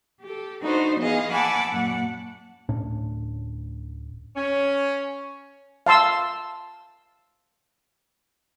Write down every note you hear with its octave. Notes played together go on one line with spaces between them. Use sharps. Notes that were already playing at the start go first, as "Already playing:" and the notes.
G4 A4
D4 D#4 F#4 B4 C5
E3 B3 G#4 D#5 F5
F#5 G#5 A5 B5 D6 E6
F#2 A#2 F#5
D1 A2 C#4 D4
C#4
F5 A5 C6 E6